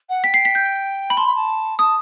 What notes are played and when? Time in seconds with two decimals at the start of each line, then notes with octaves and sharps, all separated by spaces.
0.09 F#5
0.24 G5 B6
0.34 C7
0.45 B6
0.55 G6
1.10 B5
1.17 A5 C6
1.26 B5
1.35 A5
1.78 A5 D#6